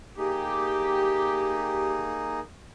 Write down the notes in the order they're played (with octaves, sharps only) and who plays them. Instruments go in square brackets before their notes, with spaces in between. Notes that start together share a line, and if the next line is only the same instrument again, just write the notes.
[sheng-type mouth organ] A#3 D#4 G#4 [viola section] G4